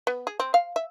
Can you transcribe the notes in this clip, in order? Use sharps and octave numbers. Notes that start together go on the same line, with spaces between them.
B3
G#4
C4
F5
E5